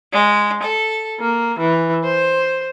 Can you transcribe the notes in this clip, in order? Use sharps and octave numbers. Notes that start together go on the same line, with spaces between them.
G#3
A4
A#3
E3
C5